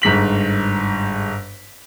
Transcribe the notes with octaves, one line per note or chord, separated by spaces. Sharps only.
G1 G#2 B6 F#7